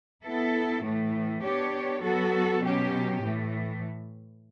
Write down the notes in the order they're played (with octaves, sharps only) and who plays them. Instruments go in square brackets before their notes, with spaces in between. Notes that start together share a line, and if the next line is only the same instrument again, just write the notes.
[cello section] B3 E4 A4
A2 E3 A3
B3 D4 G4 C#5
F#3 B3 F#4 A4
B2 F#3 C#4 G4
A2 E3 A3